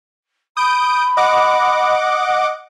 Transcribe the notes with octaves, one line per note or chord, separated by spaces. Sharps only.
B5 D#6 G6 D7
D#5 F#5 D6